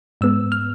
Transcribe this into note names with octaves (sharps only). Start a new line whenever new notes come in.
G#2 G#3 B3 E6
F6